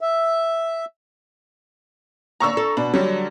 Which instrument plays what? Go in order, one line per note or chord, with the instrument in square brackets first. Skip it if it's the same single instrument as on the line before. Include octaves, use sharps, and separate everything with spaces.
[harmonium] E5
[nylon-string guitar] D#2 D3 [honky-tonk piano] A#5 C#6 E6
[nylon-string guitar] D4 A4
[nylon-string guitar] B2 [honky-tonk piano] D4
[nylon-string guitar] D3 [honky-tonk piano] F#3 G3